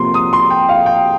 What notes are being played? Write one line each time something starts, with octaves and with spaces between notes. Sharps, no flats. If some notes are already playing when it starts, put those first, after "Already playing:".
Already playing: C3 F3 A#3 C6
D#6
C6
G5
F5
G5